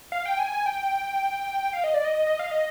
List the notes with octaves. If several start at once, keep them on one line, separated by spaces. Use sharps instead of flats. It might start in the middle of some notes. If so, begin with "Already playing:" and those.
F5
G5
G#5
G#5
G5
F5
D#5
D5
D#5
D#5
F5
D#5